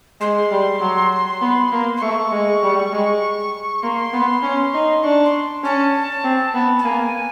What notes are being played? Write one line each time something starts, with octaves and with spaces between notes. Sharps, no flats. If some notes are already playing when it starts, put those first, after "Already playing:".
G#3 C6
G3
F#3
B3
A#3
C6
A3 C#6
G#3
G3
G#3
A#3 C6
B3
C#4
D#4
D4 C#6
C6
C#4 A5
C4
B3
A5
A#3 G#5